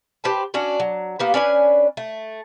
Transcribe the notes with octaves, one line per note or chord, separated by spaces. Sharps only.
G4 B4 C5 A5
C#4 D4 F#4
F#3
A#3 B3 G4
C#4 D4 B4 G#5
A3